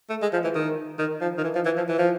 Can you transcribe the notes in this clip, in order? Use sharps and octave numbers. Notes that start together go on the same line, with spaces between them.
A3
G#3
F3
E3
D#3
D#3
F3
D#3
E3
F3
E3
F3
E3
F3